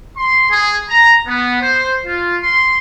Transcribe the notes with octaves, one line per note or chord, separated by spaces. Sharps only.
C6
G#4
A#5
B3
C5
F4
C6